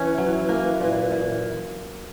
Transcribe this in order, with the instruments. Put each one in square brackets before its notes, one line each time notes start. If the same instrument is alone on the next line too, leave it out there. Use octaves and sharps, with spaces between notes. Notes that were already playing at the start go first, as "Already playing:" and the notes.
Already playing: [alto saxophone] E3 [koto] C#4
[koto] F#3
A#3
A#2
A#2